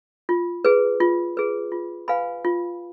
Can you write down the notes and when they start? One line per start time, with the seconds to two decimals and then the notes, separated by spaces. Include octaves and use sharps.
0.29 F4
0.65 G#4 B4
1.00 F4
1.37 G#4 B4
1.72 F4
2.08 B4 F5 G#5 B5
2.45 F4